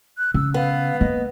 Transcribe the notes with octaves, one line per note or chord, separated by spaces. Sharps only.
F#6
C#3 E6
B3 F5
A#3 D#5